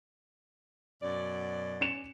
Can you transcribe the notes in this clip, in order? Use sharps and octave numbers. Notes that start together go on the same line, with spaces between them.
F#2 B2 D5
C#4 C#7 E7